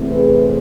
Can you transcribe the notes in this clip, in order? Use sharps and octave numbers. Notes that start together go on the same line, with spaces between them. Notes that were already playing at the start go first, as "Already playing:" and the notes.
Already playing: E2 C3 E3 A3 C4
G#4 B4